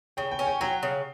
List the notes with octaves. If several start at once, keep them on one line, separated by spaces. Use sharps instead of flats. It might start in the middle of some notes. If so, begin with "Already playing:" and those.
C#3 G5
G5
C#4
G5
F#3 G5
C#3